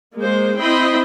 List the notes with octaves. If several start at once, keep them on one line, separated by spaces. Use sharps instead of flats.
G#3 A#3 C5
C4 E4 D#5 G5 B5 C6